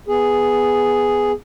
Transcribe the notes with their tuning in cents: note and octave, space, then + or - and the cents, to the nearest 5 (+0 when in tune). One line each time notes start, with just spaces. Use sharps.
B3 +0 G#4 +0